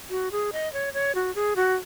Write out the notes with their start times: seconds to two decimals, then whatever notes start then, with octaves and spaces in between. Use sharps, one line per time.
0.10 F#4
0.32 G#4
0.53 D#5
0.73 C#5
0.94 C#5
1.15 F#4
1.35 G#4
1.56 F#4